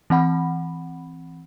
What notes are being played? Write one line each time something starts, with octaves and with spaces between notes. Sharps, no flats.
E3 C4 F#5 B5